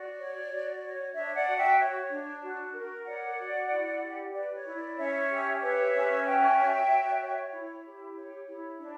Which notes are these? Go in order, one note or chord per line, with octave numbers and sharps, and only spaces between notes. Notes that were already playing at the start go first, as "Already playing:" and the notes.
Already playing: F#4 D5
C#5
F#4
C#5
D4 C#5 E5
D5 F#5
F#4
E5 G5
C#5
D4
F#4
A#4
C#5 D5 F#5
F#4
E4
G4
B4 D5
C#5
E4
D5
C#4 C#5 E5
G4
B4 C#5 E5
C#4
F#4 E5 G5
C#5
F#4
C#5
E4
G4
C#5
E4
D4